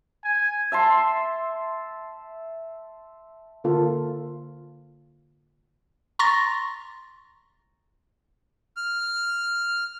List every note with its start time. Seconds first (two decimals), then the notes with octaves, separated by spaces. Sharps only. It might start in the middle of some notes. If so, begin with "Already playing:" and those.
0.24 G#5
0.72 E5 A5 C6
3.64 D3 A#3 F4 A4
6.19 A#5 C6 C#6 A6 A#6
8.77 F6